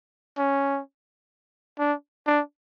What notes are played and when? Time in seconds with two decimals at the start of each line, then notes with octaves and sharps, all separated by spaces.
0.38 C#4
1.79 D4
2.27 D4